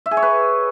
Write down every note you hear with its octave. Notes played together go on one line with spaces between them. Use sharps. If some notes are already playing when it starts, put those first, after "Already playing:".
E5
G#4
C#5
B4